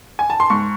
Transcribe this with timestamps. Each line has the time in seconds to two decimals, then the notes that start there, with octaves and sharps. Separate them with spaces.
0.19 G#5
0.30 A5
0.40 C6
0.50 G#2 C#6